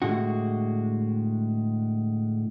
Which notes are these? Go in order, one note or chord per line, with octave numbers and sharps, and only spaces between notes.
A2 D3 G#3 F#4